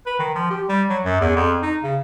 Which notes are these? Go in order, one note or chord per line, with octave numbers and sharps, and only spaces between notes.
B4
D#3
F3
G4
G3
F#3
F#2
E2
F2
D#4
C#3